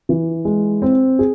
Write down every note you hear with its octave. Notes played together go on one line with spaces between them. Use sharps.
E3
G#3
C4
G#4